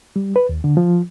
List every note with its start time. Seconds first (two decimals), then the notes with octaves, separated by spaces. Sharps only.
0.16 G3
0.36 B4
0.49 D#2
0.64 D3
0.77 F3